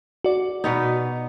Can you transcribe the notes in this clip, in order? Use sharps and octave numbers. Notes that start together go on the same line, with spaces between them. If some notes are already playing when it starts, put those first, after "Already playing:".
F#4 D5
B2 B3 D#4